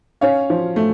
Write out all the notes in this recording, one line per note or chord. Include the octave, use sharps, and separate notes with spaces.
C#4 C#5 F5
F3
A3